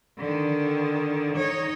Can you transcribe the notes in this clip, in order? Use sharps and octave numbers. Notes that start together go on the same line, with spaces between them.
D3 D#3
D#4 C#5